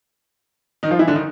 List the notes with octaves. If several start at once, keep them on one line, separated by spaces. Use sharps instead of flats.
D#3 D#4
F3 F4
E3 E4
D3 D4
D#3 D#4